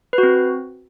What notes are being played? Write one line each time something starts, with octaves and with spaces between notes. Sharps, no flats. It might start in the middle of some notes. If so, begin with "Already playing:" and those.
B4
F#4
C4